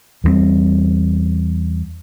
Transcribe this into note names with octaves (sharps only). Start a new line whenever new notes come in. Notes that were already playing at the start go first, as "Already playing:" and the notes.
E2 G2 G3 C4